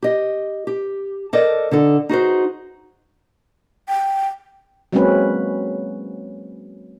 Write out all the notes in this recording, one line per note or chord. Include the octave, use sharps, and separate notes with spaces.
G4 D#5
G4
A4 A#4 C5 D5 D#5
D3 D#4 A4
D#4 F#4 G#4 C5
G5
F#3 G#3 A#3 C4 C#4 B4